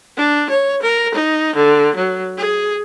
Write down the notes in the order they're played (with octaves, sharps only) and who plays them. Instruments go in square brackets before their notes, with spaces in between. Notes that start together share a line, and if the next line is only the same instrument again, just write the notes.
[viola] D4
C#5
A#4
D#4
D3
F#3
G#4